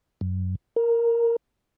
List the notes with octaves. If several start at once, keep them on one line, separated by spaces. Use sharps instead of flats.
F#2
A#4